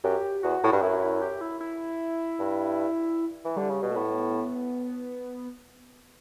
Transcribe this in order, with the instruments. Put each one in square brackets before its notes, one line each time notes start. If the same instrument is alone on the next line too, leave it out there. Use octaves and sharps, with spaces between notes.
[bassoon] F#2 [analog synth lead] G4
[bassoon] E2 [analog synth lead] F#4
[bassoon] A2
G2
[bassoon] F#2 [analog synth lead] E4
[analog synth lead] E4
G4
E4
E4
[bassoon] G2
E3
[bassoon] D3 [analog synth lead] G3
[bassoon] C#3
B2
[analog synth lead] A3
[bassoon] A2 [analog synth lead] B3